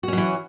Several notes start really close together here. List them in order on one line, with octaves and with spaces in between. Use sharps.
F#4 C#4 F#3 E3